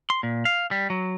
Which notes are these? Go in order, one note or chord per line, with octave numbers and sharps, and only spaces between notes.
C6
A#2
F5
G3
F#3